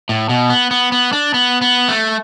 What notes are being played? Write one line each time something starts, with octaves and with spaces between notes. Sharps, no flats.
A2
B2
B3
B3
B3
D4
B3
B3
A3